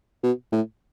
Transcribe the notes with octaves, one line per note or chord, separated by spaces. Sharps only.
B2
A2